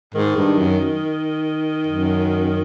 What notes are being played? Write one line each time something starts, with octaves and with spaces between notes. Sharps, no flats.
G#2 D#3
G2
F#2
F#2